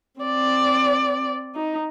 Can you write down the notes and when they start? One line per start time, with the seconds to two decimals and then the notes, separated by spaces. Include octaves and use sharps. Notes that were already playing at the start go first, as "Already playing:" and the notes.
0.21 C4 D5
1.55 D#4